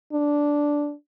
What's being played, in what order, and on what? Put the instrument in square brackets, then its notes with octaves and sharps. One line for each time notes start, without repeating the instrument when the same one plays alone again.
[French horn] D4